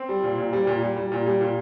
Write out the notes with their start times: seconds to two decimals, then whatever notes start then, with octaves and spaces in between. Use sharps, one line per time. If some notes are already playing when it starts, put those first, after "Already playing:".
Already playing: C4
0.09 G3
0.23 A#2
0.38 A#2
0.53 G3
0.67 A#2
0.82 G3
0.96 G3
1.12 A#2
1.26 G3
1.41 A#2